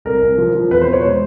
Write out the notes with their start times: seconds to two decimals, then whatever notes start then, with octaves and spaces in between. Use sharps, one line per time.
0.05 C2 A#4
0.23 C2
0.38 F3
0.55 F3
0.71 E2 B4
0.81 C5
0.88 B2 C#5
1.03 G#3 C5